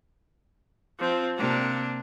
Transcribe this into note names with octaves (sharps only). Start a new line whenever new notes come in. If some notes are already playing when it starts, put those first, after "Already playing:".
F3 C4
C3 A#3 D4